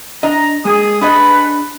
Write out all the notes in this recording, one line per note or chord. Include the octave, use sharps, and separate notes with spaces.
D4 D#5 A#5
G#3 G#4 D#6
D4 F#4 G#4 A4 B4 D#5 B5